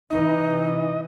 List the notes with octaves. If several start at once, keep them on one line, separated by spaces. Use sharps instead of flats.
C3 E3 D#4 D#5